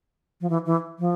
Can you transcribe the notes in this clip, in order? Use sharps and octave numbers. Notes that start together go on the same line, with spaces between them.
F3
E3
E3
F3